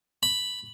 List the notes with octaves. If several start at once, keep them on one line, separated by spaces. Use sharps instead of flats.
B5